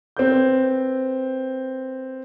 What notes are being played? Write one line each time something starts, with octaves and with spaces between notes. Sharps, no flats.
C4 B4 G6